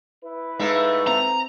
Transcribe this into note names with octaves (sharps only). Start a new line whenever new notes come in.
E4 B4
A2 G#3 A3 D#4 E5 F5
C4 A#5